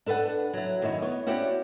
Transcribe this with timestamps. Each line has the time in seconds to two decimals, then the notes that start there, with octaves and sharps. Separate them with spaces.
0.06 D4 A4 B4 E5 F#5
0.54 F#3 E4
0.81 F#2 D#3 D#4 E4 F#4
1.02 B3 C#5
1.26 C#4 E4 F#4 G4 C5 D5